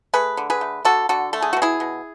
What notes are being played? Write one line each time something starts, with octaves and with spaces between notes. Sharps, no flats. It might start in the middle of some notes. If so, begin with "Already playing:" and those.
A3 G#4 B4
D3
G#4 B4
A3
D3 F#4 A4
D3 F#4 A4
A3 A4
G#4
B2 F#4
E4 G#4
B2